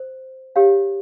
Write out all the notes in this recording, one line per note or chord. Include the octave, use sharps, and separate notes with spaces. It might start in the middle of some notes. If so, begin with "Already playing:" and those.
Already playing: C5
G4 C#5 F5